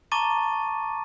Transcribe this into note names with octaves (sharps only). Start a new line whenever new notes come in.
A5 A#5 C#6 D6 A6 D#7